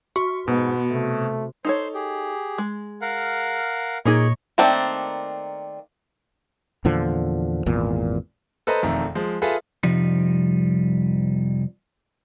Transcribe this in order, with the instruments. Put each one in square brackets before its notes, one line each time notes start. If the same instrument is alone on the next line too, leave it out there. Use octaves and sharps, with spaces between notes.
[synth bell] F#4 [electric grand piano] C#6
[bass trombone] G#2 [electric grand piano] B2 [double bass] B3
[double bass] C3 [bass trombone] A3
[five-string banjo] D#4 A4 C#5 [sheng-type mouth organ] C5
[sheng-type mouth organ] G4 G#4
[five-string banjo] G#3
[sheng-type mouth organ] A#4 F5 F#5
[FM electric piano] A#2 [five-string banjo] A#3 D#4 G#4 [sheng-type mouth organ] C#5 D#5 C#6
[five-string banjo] D#3 A3 A#3 C4 D4
[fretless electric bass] E2 A#2 D3 F3
G#1 E2 A#2
[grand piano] A4 B4 C5 D#5 A#5
E1 F2 D#3 A3 A#5
F3 G#3
F4 G#4 A4 B4 E5
[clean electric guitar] C2 F2 F3 G3 D#4